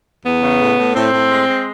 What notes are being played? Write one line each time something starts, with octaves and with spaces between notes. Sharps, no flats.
E2 B3
C#3
A2
A2
A2 C4
A2
G#3
G#3